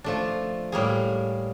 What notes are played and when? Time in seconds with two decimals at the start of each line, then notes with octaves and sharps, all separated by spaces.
0.04 F3 A3 D4
0.72 A2 G3 A#3 G#4